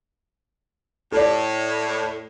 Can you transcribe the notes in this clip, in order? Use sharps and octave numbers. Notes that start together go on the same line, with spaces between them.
A2 A4 D5